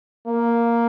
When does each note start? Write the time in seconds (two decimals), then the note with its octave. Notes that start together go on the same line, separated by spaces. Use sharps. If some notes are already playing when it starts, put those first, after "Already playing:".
0.27 A#3